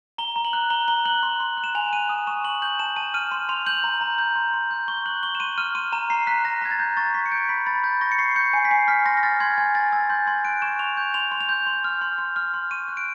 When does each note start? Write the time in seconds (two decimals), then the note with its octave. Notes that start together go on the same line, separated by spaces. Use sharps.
0.18 A#5 G7
0.36 A#5
0.45 F#7
0.53 F#6
0.70 A#5 G7
0.88 A#5 G7
1.05 F#6 F#7
1.23 C6
1.40 C6
1.57 F#6
1.64 E7
1.75 G#5 F7
1.92 F#6 D#7
2.09 D#6
2.27 C#6 E7
2.44 C#6 F#7
2.62 G6 F#7
2.79 A5 E7
2.96 A5 D#7
3.14 F6 D#7
3.31 C6
3.49 C6 F7
3.66 G6 F#7
3.84 A#5
4.01 A#5
4.18 G6
4.36 C6
4.54 C6
4.71 G6
4.88 C#6 G7
5.06 F#6 F#7
5.23 C#6 G7
5.35 E7
5.40 C6 D#7
5.58 F6 D#7
5.75 C6 D#7
5.92 A#5 E7
6.10 A#5 C7
6.27 F#6 B6
6.45 A#5 A#6
6.62 A#5 G#6
6.71 A6
6.79 G6
6.97 C#6 A6
7.14 C#6 B6
7.26 C#7
7.32 G6 D7
7.49 B5 B6
7.66 B5 A6
7.84 G6 A6
8.01 C#6 A#6
8.12 C#7
8.18 C#6 C7
8.36 G6 C#7
8.53 G#5 C7
8.65 B6
8.71 G#5 C7
8.88 F6 B6
9.06 C6 A#6
9.17 A#6
9.23 F6 A6
9.40 C6 G#6
9.58 G#5 G#6
9.75 G#5 A6
9.93 E6 A6
10.10 C6 G6
10.27 C6 G#6
10.45 F#6 D7
10.62 C#6 E7
10.79 C#6 F7
10.97 G6
11.14 C6 F7
11.32 C6
11.41 F7
11.49 G6
11.66 C6
11.84 F6
12.02 C6
12.18 C6
12.36 F6
12.54 C6
12.71 C#6 D#7
12.88 F#6
12.97 D7